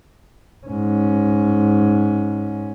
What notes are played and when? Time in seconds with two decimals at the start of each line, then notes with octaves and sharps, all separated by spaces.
0.67 G#2 C#4